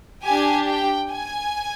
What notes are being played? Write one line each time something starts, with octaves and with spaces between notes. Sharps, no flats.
D4 G4 G#5
G5
G#5